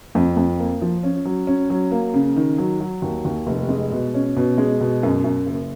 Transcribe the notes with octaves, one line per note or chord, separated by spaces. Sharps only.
F2
F2
A#3
F3
C#4
F#3
C#4
F#3
A#3
C#3
D#3
F#3
F#3
D#2
D#2
F1
G#3
B2
C#4
B2
G#3
B2
F#2
F#2
F#1